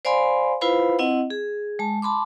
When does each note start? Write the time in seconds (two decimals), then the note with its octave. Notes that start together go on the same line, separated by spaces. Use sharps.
0.05 C5 D5 F5 G#5 B5 C6
0.61 E4 F4 B4 C5 F5 B5
0.99 C4 E4 D#5 F#5
1.30 G#4
1.79 G#3 A5
2.02 A5 B5 C6 D6